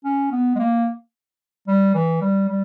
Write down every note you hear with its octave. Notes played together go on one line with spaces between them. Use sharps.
C#4
B3
G#3
A#3
G3
E3
G3
G3